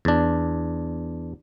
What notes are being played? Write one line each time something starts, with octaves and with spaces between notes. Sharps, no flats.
E2 D4